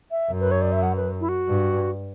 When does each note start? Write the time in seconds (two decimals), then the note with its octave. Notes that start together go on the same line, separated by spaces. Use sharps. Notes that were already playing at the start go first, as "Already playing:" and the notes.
0.11 E5
0.31 F#2
0.41 B4
0.51 C#5
0.62 D5
0.72 E5
0.83 F#5
0.96 B4
1.20 E4
1.29 F#4
1.48 G2